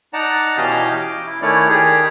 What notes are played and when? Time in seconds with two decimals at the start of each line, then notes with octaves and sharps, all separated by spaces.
0.13 D#4 D5 F#5 A5 A#5
0.57 B2 E3 C#4 G4 D#5 F5
1.01 D6
1.26 E4
1.42 D#3 A3 C#4 E4 C#5 D5
1.68 D#3 G4 G#4